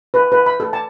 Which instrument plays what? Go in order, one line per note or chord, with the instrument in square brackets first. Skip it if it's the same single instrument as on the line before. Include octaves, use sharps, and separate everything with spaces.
[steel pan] B4
B4
B5
A4
A5